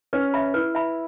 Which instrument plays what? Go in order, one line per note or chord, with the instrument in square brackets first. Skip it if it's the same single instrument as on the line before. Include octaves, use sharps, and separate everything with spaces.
[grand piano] C#4 [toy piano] B4
[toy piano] E5 B5
[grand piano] E4 [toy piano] B4
[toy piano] E5 B5